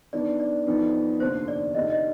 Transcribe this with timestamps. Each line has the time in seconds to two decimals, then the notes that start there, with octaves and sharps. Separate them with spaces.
0.13 D#3 B3 D4 D5
0.40 D5
0.67 F2 D#3 B3 D#4
1.20 F1 D#2 D3 C5
1.48 D5
1.75 D2 C3 D#3 D#5
1.90 D#5